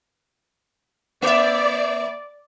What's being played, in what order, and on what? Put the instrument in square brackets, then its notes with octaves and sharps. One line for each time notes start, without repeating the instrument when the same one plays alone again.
[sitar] A#3 E5 [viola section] D5